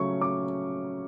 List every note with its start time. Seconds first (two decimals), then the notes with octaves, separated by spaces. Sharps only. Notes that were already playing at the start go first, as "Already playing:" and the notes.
Already playing: C#3 F#3 A3 C#4 C#6
0.21 D6